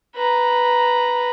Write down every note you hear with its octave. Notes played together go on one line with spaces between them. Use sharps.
B4 A#5